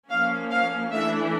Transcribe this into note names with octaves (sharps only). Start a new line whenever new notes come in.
F3 A#3 C#4 F5
F5
E3 A3 D4 E5